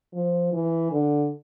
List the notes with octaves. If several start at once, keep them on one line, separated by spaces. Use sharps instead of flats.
F3
E3
D3